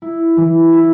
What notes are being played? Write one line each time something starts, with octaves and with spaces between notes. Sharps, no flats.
E4
E3
E4